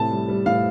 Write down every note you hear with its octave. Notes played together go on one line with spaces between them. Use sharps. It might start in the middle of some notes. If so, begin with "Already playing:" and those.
Already playing: A2 C3 A5
G3
G3
A2 F5